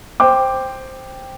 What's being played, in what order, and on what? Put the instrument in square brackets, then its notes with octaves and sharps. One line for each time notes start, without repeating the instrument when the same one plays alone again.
[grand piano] C5 G5 D6